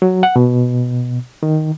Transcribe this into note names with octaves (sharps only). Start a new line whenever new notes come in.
F#3
F#5
B2
D#3